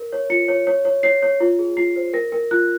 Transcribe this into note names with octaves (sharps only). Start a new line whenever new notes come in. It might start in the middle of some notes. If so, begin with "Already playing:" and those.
Already playing: A#4
C#5
F4 C#7
C#5
C#5
C#5
C#5 C7
C#5
F4
G#4
F4 C7
C5
A#4 A#6
A#4
F4 F#6